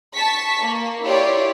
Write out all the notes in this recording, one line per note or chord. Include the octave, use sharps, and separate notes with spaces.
A5 C#6 B6
A#3
E4 F4 G4 C#5 D5